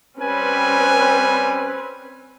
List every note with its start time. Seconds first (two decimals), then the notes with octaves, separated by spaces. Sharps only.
0.20 G3 C4 C#4 B4 G#5